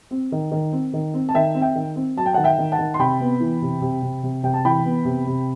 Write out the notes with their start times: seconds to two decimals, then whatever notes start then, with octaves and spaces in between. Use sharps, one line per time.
0.11 C4
0.32 D#3
0.52 D#3
0.72 C4
0.93 D#3
1.14 C4
1.29 A5
1.34 D#3 E5 G5
1.55 C4
1.61 E5 G5
1.76 D#3
1.96 C4
2.17 F#3 A5
2.26 G5
2.33 D#3 F#5 A5
2.44 E5 G5
2.58 D#3
2.72 F#5 A5
2.79 D#3
2.94 C6
2.99 C3 G5 B5
3.21 B3
3.40 E3
3.62 C3
3.81 C3
4.02 C3
4.23 C3
4.43 C3 G5
4.54 A5
4.65 E3 G5 B5
4.85 B3
5.05 C3
5.27 C3